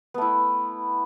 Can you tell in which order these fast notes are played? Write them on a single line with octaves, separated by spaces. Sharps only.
B3 A3 E4